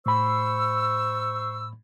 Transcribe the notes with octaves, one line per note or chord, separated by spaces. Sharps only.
A2 C5 B5 C#6 E6